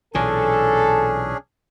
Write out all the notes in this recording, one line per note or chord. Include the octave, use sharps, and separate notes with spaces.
B1 A#2 E3 C#4 D4 G#4 A4